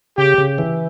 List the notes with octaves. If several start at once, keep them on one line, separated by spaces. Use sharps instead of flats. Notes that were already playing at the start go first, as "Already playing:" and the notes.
C#3 G4
C#3
E3